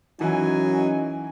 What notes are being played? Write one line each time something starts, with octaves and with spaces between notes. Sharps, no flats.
F#2 E3 F#3 C#4 D#4 G#5